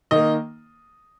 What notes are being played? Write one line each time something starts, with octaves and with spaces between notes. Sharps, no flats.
D#3 A#3 D#5